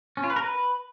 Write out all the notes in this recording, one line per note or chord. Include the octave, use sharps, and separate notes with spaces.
C#4
F4
B4
A#4
B4